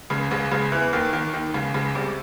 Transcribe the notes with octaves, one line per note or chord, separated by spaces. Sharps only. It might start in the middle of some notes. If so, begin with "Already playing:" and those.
C#2 C#3
C#2 C#3
C#2 C#3
E2 E3
D#2 D#3
D#2 D#3
D#2 D#3
C#2 C#3
C#2 C#3
C2 C3